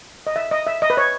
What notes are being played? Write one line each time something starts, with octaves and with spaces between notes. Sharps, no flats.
D#5
E5
D#5
E5
D#5
B4
C#5